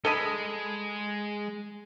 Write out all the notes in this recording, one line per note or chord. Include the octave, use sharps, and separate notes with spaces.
G#3 A4 D#5 B5